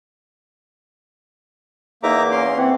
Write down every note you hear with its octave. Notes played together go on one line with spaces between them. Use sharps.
E2 A#3 D#4 E5 A#5 D6
C#4 C6
E3 C4 F#5